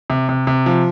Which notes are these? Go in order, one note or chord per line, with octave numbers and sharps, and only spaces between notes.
C3
C3
C3
F3